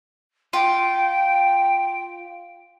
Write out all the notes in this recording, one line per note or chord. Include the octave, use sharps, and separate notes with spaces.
F4 G5